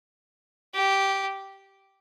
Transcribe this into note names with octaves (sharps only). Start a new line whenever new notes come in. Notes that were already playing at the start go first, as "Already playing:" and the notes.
G4